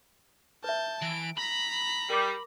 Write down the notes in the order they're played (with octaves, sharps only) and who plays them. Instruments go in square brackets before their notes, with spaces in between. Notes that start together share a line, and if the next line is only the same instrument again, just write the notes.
[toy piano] B4 E5 [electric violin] A5 G6
[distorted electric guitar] E3 [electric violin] D7
[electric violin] A#5 B6 [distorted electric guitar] B5
[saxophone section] G3 [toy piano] A#4 D6